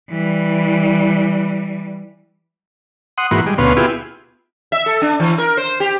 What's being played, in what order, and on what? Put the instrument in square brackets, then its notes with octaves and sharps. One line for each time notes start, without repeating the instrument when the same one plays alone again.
[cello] E3 G3
[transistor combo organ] F#5 C6 D#6
G#2 E3 A#3 F#4 B5 C6
G3 G#3
D2 B2 B3 C#4 F5 C6
B3 E4 F4 G4 G#4
[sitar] E5
A4
D4
E3
A#4
C5
G4